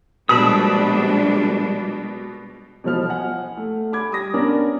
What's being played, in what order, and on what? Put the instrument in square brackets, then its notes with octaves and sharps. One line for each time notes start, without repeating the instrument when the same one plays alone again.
[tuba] A#1 [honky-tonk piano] B2 [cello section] G3 G#3 D4 [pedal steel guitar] A5 B5 D#6
[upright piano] B2 E3 F3 F6
F#5 G#5
A3
B5 D6 G#6
G3 D#6 A#6
B3 C#4 D4 A#4 D5